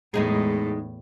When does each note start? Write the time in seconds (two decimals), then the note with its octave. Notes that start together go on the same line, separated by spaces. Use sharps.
0.14 E2 A2 G#3 D#4 G#4